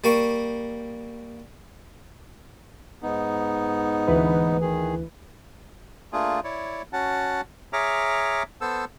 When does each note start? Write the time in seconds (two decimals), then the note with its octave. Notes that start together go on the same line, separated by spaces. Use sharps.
0.04 G3 A#3 C#6
3.03 G#2 B3 D#4
4.08 D2 E3 B4
4.61 D#3 G#4
6.13 A3 A#3 D4 F4 G#4
6.44 E4 C#5 D5
6.93 C#4 F#4 F#5 A5
7.73 G#4 C#5 E5 A#5 D6 F6
8.61 B3 A4 C5 E6